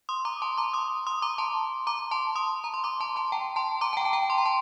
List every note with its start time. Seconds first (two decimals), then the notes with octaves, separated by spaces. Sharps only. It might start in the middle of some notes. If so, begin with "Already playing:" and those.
0.09 C6 D#6
0.25 A#5 D6
0.42 A5 C6
0.58 A#5 D6
0.74 C6 D#6
1.07 C6 D#6
1.22 A#5 D6
1.38 A5 C6
1.87 A#5 D6
2.11 A5 C6
2.35 C6 D#6
2.64 A#5
2.74 C6
2.84 A#5 D6
3.00 A5 C6
3.16 A5 C6
3.32 G5 A#5
3.56 A5 C6
3.81 A#5 D6
3.93 A5
3.97 G5 A#5
4.05 A5
4.13 G5 A#5
4.30 C6
4.38 A#5
4.45 A5 C6